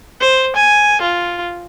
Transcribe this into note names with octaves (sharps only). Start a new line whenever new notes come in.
C5
G#5
F4